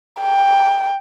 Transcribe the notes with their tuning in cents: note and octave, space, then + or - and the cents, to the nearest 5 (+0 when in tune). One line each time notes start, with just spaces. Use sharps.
G5 +10